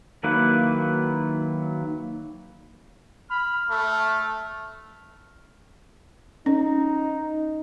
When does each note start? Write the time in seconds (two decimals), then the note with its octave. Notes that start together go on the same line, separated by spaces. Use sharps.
0.23 D#3 F#3 A#3 E4 B4
3.31 B5 F6
3.70 A3
6.46 C#4 D#4